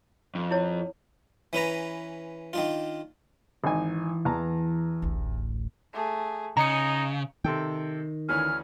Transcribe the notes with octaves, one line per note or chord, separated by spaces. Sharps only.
F2
E4 C#5
E3 C#4 B4 A#5
D#3 D4 F4
G#1 E3 D#4 G#5
E2 A5 A#5
D1 A1
A3 G#4
C#3 D#4 D#5 A#5 C#7
C3 D#3 A4 G5
D2 E3 C#4 F6